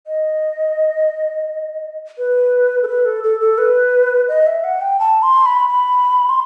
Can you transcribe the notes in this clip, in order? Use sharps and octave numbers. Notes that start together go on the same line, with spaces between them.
D#5
B4
A4
B4
A4
A4
A4
B4
D#5
E5
F#5
G5
A5
C6
B5
B5
C6